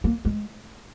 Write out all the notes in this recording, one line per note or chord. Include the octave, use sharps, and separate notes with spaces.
A#3
G#3